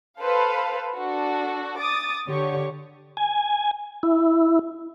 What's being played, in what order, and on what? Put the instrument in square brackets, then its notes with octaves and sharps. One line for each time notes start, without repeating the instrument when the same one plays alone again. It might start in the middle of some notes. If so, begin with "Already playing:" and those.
[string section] A4 B4 C5 F5
D4 F#4 A4
D6 D#6 A6
D3 G4 C#5 C#6
[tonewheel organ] G#5
E4